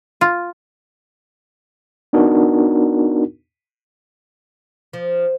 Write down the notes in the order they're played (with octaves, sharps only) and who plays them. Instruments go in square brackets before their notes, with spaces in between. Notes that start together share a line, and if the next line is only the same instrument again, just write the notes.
[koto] F4
[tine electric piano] B3 D4 D#4 F#4 A#4
[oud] F3